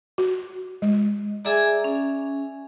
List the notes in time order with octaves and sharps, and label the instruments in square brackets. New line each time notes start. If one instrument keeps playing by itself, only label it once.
[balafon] F#4
G#3
[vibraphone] G#4 A#5 [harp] D5 E5 G#5
[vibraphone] C#4